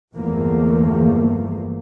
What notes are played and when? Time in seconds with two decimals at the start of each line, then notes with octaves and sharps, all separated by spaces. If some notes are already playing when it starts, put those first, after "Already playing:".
0.15 G1 E2 F3 A3 A#3